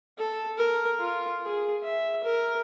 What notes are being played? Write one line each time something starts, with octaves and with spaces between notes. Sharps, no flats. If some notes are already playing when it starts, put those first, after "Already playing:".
A4
A#4
F4
G#4
E5
A#4